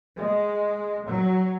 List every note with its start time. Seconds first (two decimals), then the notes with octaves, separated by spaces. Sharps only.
0.17 G#3
1.06 F#3